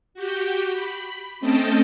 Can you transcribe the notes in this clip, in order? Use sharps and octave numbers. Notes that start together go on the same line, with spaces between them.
F#4 G4 G5
B5
A3 C4 C#4 D#5 G5 A5